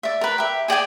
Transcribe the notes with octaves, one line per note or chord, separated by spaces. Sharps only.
D5 E5
A#4 B4
G4 E5
G#4 D5 G5 G#5